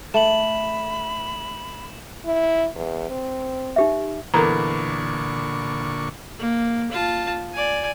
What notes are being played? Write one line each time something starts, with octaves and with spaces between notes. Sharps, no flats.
A3 B5 E7 F#7
E4
E2
C4
D#4 G4 E5
E2 A#2 D3 A4 A#4 A#5 C#6
A#3
F4 A5
D5 G#5